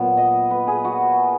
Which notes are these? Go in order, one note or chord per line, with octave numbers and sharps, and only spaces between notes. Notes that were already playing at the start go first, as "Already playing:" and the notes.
Already playing: A#2 F#3 B3
D#5
B4
G#4
F#4